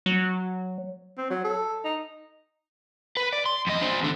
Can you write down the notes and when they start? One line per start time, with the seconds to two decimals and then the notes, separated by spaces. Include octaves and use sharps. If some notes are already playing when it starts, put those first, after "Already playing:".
0.06 F#3
1.17 C4
1.30 F#3
1.44 A4
1.85 D#4
3.17 B4
3.33 D5
3.46 C6
3.67 F2 D#5
3.82 D4 C5
4.00 E2 D3